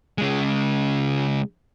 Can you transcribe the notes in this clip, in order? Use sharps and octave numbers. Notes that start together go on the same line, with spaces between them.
C#3 G#3